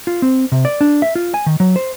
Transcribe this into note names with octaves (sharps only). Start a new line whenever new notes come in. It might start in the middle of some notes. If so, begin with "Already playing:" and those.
F4
C4
C3
D5
D4
E5
F4
G#5
D#3
F#3
C5